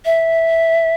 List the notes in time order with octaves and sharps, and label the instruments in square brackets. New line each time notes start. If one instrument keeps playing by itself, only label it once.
[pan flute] E5